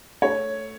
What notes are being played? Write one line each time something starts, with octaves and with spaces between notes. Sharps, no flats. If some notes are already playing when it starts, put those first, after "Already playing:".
A3 C#5